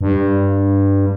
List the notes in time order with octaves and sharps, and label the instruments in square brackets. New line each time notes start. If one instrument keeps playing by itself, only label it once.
[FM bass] G2